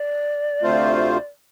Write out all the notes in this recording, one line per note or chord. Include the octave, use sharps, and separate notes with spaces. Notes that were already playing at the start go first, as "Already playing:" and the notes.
Already playing: D5
D2 C3 A3 F4 C5